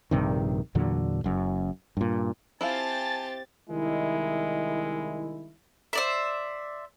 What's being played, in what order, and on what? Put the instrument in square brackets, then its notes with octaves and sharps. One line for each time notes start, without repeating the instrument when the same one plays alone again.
[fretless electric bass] A#1 G2 C3 D#3
E2 A#2 D3 F#3
F#1 F#2
G2 A#2
[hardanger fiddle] C4 G4 [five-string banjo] E4 F4 F5 [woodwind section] G#5 A5 [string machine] A6
[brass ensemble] C2 D#3 G#3 E4
[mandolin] C5 D5 E5